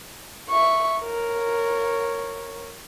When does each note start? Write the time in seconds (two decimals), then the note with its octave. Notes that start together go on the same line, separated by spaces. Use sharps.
0.50 E5 C#6
1.02 A#4 C#5